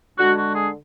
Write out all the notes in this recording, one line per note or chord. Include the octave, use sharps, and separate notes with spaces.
D3 G#3 D4 F#4
F#4
G#4